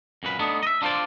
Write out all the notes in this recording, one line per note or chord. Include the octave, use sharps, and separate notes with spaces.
F#2 A#2 B4
A3 B3 D4 D#4
D#5 E5
D4 F4 A4 C5 D5